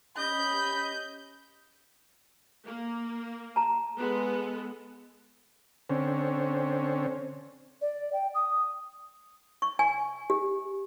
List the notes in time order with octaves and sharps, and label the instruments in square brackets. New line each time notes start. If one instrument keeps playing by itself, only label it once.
[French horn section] C#4 G4 [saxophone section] D#5 [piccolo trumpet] B5 [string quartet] G6
[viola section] A#3
[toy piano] A5 A#5
[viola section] G#3 B3 A4
[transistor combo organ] D3 C4 C#4
[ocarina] D5
G5
D#6
[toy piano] C#6
G#5
G4